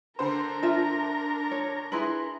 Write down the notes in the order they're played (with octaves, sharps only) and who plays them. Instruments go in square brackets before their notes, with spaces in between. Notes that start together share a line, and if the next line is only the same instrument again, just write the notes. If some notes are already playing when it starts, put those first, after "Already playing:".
[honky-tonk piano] D3 C5 [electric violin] D4 A#4
[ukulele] F4 E5 A5
C#5
[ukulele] E4 G#4 B4 [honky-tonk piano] C6 F#7